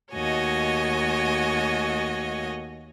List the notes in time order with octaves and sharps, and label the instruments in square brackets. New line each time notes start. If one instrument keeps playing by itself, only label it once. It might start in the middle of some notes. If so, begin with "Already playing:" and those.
[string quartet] D#2 A3 F#4 C#5 D#5 G#5